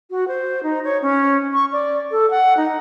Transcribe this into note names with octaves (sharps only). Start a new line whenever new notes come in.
F#4
C5
D#4
C#5
C#4
C#6
D5
A4
F#5
D#4